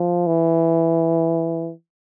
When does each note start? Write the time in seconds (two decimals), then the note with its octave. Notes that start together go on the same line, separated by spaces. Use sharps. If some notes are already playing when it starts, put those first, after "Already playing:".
Already playing: F3
0.27 E3